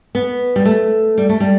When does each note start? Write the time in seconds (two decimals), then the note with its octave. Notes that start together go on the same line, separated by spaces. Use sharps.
0.15 B3
0.56 G3
0.65 A3
1.18 G3
1.29 A3
1.40 G3